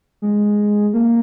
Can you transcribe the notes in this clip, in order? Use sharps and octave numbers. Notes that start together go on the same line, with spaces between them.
G#3
A#3